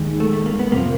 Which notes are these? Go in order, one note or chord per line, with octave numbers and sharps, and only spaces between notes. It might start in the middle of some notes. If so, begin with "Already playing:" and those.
Already playing: D#2 D#3 G#3
A3
A3
A#3
B3
F2 C3 F3 A#3